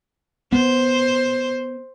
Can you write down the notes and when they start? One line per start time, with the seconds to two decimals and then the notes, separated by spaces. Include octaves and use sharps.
0.52 B3 C5